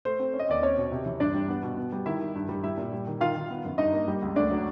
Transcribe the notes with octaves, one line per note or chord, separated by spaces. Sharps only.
A3 C5
C4
C#4
D#5
D#2 D5
C4 C#4 C#5
B2
C3
E3
G2 D4 D5
G3
B3
B2
B3
G3
D#3 E4 E5
D#3
G2
G3
G3 E4 E5
A#2
G3
D#3
D#3 F4 F5
D#3
B3
F#2
G2 D#4 D#5
A#3
G3
C#2
D2 D4 D5
F#3